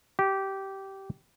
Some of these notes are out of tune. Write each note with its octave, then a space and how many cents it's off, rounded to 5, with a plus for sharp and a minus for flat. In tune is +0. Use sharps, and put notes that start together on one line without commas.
G4 -15